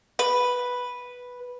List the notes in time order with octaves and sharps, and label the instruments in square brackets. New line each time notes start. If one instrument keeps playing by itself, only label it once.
[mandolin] B4